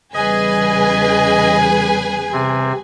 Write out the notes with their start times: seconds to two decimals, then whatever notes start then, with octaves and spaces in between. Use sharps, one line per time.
0.14 E2 C#3 G3 G#4 B4 D#5 G#5
2.33 C3 C4